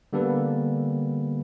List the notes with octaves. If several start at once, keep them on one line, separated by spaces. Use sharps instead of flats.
D3 G3 A#3 B3 A4 B4